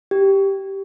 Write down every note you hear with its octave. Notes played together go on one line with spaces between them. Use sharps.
G4